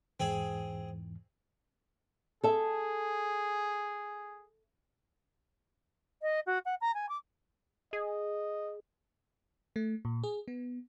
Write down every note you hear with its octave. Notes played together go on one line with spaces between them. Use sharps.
E2 G#2 E3 C4 G#4
G#4 A4 E5
D#5
F#4
F#5
A#5
G#5
D6
G#4 D#5
A3
A#2
G#4
B3